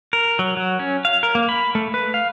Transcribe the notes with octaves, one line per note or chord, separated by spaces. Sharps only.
A#4
F#3
F#3
C#4
F5
A#4
A#3
B5
A3
B4
F5